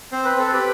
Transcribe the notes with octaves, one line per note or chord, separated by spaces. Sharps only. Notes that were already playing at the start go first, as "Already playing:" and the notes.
C4 C5
B4
C4 A4
G4 B4